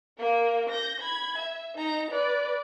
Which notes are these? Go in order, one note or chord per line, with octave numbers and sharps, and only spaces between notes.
A#3 A#4
G6 A#6
B5 G#6
E5
D#4 A#5
B4 D5